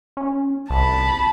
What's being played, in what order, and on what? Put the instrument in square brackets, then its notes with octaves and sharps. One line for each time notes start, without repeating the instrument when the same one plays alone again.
[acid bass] C#4
[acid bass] C2 [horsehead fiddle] A5 B5